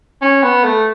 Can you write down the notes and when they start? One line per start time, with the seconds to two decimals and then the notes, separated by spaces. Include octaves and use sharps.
0.22 C#4
0.43 B3
0.64 A3